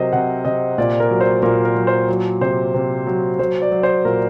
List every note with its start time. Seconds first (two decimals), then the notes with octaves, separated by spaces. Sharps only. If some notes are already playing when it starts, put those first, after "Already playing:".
Already playing: C3 F#3 A#4 C5 D#5
0.13 C3 F#5
0.45 C3 D#5
0.78 A#2 D5
1.00 A#4
1.10 F#3
1.21 C5
1.42 A#2 A#4
1.65 A#4
1.75 F#3
1.87 C5
2.09 F#3
2.41 C3 C5
2.74 C3
3.07 F#3
3.39 F#3 C5
3.62 D5
3.71 F#3
3.83 C5
4.05 A#2 A#4